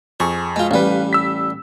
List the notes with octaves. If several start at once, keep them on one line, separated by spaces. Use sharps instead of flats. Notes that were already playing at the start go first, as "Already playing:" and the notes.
F2 G#4 C#6
G#3 F4
A1 G3 B4 F5
E6 B6